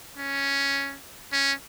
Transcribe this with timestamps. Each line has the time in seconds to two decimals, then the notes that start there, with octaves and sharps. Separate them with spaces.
0.17 C#4
1.32 C#4